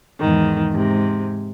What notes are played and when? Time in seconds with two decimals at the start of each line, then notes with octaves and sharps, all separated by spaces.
0.19 E2 G#2 D#3
0.72 G#2 C3